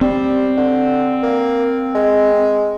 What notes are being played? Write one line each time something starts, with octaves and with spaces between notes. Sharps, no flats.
G3 C4
D3
A#3
G#3